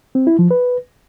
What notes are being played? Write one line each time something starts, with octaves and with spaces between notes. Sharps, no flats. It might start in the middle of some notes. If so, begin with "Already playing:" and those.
C4
E4
F3
B4